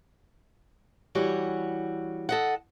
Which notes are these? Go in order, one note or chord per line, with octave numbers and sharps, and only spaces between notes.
E3 G3 F#4 C#5
A4 D#5 F#5